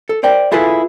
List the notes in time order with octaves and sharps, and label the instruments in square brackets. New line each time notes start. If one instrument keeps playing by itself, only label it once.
[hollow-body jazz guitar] A4
A#4 C5 D5 G5
E4 F4 G#4 A4 B4